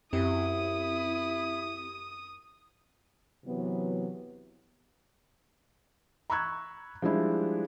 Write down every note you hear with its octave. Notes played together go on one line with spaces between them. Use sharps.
F#2 C4 E4 G4 D#6
C3 E3 F#3 B3
A#5 B5 C#6 E6 F#6 G#6
F3 G3 G#3 D4 E4